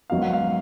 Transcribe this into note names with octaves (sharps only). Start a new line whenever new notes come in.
G#1 G#2 D#3 F#3 B3 F5
F#5
F5